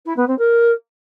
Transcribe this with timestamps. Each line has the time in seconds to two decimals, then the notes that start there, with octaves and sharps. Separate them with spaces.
0.05 E4
0.16 B3
0.27 C4
0.38 A#4